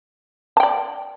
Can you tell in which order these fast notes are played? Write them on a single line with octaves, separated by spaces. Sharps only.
A5 G5 D5